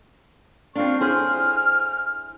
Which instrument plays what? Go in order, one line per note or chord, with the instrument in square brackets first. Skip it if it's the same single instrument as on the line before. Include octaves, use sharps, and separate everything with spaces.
[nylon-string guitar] C4 D4 [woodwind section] F4 C#6
[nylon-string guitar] E4 G#4 C5 [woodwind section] F6